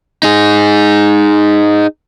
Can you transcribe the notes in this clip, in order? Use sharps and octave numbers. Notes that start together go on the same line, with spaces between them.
D#4 G#4